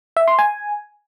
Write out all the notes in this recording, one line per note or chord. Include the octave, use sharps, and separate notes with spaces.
E5
C6
G#5